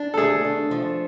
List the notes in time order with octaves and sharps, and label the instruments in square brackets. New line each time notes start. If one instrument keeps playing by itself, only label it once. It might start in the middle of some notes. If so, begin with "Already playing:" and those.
Already playing: [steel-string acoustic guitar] D4
[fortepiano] A4
[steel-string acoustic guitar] A3 [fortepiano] G#4
[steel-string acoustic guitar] D4
F3